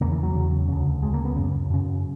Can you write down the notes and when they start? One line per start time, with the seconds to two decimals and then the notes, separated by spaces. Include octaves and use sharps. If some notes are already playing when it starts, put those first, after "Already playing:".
0.01 E2 C#3 A#3
0.12 E3
0.23 F#3
0.34 E2 C#3
0.68 D2 C#3
1.02 D2 G#3
1.05 C#3
1.14 A#3
1.25 B3
1.36 F#2 C#3
1.70 F#2 C#3